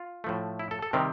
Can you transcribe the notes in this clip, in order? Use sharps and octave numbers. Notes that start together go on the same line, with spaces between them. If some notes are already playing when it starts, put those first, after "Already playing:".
Already playing: F4
A2 F3 A3
E4
A4
A4
C3 D#3 G3 C4 A#4